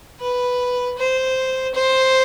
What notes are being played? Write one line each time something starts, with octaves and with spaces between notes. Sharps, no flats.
B4
C5
C5